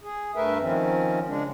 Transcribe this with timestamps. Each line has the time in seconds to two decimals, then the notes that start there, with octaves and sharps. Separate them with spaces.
0.01 G#4
0.35 G2 A3 A#4 B4 E5
0.61 D#3 F3 C4 C#4
1.27 C#3 G#3 D4